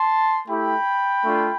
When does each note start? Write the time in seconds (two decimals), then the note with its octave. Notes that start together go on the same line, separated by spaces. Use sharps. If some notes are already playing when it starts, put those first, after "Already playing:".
Already playing: A5 C6
0.48 A3 E4 G4 G5 B5
1.24 A3 D4 F4